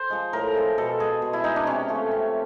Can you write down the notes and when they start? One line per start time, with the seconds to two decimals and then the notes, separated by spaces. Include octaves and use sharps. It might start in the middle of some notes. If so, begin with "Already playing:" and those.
Already playing: C5
0.10 F3 G#3
0.33 A2 A#4
0.55 F3 G#3
0.78 B2 A4
1.00 G#3 G#4
1.22 B2
1.33 E4
1.44 G#3 D#4
1.56 D4
1.67 C3 C#4
1.88 F3 A3
2.11 C3